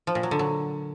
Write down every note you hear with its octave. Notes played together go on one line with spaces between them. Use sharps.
F3
A#2
F#3
D3
F#3